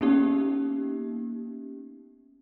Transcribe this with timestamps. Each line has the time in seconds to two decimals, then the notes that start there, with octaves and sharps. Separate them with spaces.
0.01 A#3 B3 C#4 D#4 G4